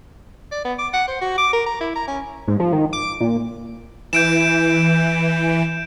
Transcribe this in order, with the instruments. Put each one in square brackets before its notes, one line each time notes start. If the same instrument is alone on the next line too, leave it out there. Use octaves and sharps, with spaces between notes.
[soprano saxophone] D5
B3
D6
F#5
C5
F#4
D6
A#4
A#5
E4
A#5
C#4
[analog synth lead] G#2
F3
D#3
D6
A#2
[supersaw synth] E3 [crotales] G6 D7 E7